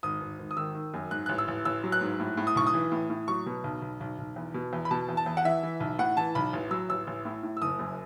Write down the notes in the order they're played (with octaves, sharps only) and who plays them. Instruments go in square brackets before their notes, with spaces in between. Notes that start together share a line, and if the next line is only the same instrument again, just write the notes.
[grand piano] G#1 D#6
G#1
G#1
D#6
D#3 E6
D#3
F#2
G#2 F#6
A1 F#6
E6
A1
A1 E6
F#3
F#6
G#2
A2
A2
D#6
B1 C#6
D#6
E3
A2
A2
F#3 C#6
B2
B1
B1
B1
B1
E2
B2
E2
B5
B2 A5
E2
A5
E2
F#5
E3 E5
E3
B1
A2 F#5
E3 A5
B1 B5
A1
F#3 E6
A1 E6
A1
A2
A2
E6
F#1 D#6
F#2